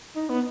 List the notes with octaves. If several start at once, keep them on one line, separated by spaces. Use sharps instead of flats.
D#4
B3